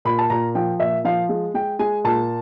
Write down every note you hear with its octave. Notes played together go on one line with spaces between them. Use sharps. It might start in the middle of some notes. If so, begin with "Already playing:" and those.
A#2 B5
A5
A#2 A#5
F3 G5
A#2 E5
F3 F5
G#3
G#3 G5
G#3 G#5
A#2 A5